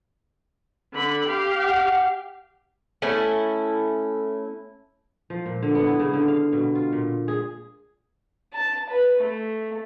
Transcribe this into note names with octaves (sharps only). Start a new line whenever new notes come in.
D3 B5
G4 F5
F#5
A3 C#4 E4 A4
F3
A#2
D3
B3
E4
C#3
D3
F5
B2
F4
A#2
G#4
A5
B4
A3